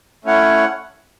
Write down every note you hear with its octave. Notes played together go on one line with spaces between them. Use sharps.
A3 C#4 E4 C#5 F#5